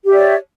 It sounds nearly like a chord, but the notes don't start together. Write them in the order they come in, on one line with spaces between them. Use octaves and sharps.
G4 E5 D5 C#5